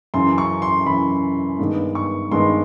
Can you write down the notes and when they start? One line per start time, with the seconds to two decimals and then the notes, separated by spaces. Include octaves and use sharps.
0.14 F#2 C#3 E3 C6
0.38 C#6
0.62 C6
0.86 F#2 C#3 E3 B5
1.59 G2 D#3 G#3 B3
1.95 C#6
2.32 G2 D#3 G#3 B3 C6